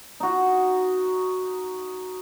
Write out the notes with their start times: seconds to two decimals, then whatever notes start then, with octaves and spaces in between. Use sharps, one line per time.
0.20 D#4 F#4